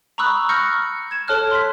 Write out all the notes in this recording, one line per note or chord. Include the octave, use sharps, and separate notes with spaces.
A#5 B5 C#6 D#6 E6 F#6
C#6 E6 F6 G6 A#6 C#7
G#6 E7
A4 C#5 A5 F6 F#6
C6 B6